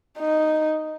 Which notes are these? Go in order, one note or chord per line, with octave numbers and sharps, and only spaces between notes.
D#4